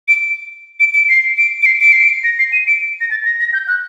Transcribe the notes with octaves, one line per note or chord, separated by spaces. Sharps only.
D7
D7
D7
C7
D7
D7
C7
D7
C7
D7
A#6
C7
D#7
D7
A#6
A6
A#6
A#6
G6
F#6